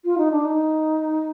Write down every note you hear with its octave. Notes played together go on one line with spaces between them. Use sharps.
F4
D#4
D4
D#4